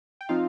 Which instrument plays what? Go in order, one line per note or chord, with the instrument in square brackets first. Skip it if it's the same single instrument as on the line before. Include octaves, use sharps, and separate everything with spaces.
[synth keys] G5
F3 C4 D#4 F4 F5